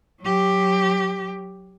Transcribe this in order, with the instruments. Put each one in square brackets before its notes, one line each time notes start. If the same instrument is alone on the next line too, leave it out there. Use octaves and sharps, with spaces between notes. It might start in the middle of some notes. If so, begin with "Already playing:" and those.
[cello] F#3 G4